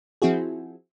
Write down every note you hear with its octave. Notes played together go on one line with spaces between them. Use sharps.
F3 C4 E4 F#4 G#4